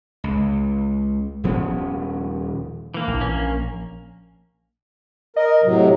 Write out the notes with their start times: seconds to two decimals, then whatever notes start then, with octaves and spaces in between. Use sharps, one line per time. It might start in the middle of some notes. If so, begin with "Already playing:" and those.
0.24 C#2
1.44 D#1 F3 B3 C#4
2.94 E3 A#3
3.08 A#1
3.21 A#3 C#4
5.36 A#4 D#5
5.64 A2 C3 F#3